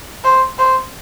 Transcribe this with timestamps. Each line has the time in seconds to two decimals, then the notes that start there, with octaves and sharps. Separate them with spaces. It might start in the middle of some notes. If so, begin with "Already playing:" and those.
0.24 C5
0.59 C5